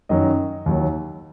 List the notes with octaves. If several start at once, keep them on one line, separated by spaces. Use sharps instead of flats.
F#2 D#3 F#3 D#5
D#2 D#3 F#3